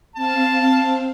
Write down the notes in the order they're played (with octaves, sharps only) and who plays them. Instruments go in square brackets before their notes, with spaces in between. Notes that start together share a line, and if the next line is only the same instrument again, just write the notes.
[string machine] C4 F5 [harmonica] A5